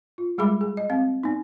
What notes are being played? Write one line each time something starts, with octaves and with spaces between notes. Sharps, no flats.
F4
G3 G#3 G#4 E5 B5 D6
G#4
D#5
C4 F5
B3 D#4